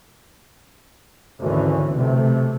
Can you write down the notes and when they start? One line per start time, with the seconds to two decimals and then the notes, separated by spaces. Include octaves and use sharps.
1.40 G#1 D2 D3 E3 C#4
1.92 B1 C3 A3